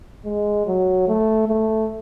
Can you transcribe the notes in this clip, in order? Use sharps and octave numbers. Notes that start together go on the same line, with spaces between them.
G#3
F#3
A3
A3